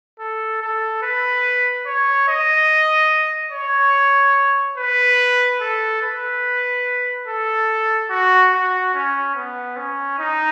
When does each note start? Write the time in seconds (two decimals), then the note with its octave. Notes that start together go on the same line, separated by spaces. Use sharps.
0.19 A4
0.61 A4
1.02 B4
1.86 C#5
2.28 D#5
3.52 C#5
4.77 B4
5.60 A4
6.02 B4
7.27 A4
8.10 F#4
8.53 F#4
8.94 C#4
9.36 B3
9.77 C#4
10.19 D#4